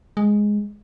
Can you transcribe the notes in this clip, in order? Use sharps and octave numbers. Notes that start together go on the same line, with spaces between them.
G#3